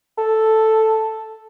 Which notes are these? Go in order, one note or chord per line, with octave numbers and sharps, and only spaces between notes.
A4